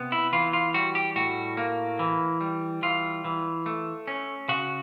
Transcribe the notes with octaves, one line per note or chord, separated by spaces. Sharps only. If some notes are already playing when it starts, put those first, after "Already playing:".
Already playing: C3 B3
E4
E3 F4
F4
G3 F#4
G4
A2 F#4
A#3
E3
G3
E3 F4
E3
A3
C#4
C#3 F#4